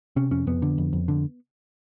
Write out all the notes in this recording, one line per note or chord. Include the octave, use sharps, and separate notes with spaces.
C3 C#4
F2 C#4
F2 B3
D3
F2
F2
D3